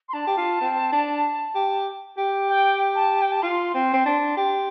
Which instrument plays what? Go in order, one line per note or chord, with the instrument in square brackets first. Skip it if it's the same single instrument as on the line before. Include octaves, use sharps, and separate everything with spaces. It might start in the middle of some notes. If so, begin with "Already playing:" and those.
[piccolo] C6
[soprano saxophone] D4 [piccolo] A5
[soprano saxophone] G4
F4
C4
D4
G4
G4
[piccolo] G5
A5
G5
A5
[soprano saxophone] F4 [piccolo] C6
[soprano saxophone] C4
C4
D4
G4